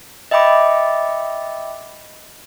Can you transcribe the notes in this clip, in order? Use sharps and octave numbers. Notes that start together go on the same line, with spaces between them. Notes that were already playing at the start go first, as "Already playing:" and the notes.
D#5 E5 G5 B5 D6